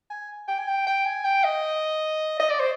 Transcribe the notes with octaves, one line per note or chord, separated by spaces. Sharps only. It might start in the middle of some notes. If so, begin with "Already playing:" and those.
G#5
G5
G#5
G5
G5
G#5
G5
D#5
D#5
D5
C5